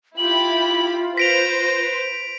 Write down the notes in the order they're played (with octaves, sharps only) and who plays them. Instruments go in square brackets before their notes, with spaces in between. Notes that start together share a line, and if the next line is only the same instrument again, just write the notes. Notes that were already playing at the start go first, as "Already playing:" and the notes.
[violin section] E4 G4 B5 [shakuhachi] F4 [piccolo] F#7
[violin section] B4 C5 [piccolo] A#6 [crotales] B6 D7 F7